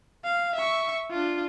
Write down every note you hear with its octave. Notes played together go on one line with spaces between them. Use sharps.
F5
E5 C#6
D4 F4